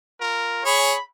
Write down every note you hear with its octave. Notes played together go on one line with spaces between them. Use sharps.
F4 A#4
G#4 C#5 B5